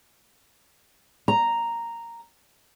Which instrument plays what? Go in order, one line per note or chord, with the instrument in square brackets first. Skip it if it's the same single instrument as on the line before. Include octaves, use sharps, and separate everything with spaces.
[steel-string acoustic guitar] A#5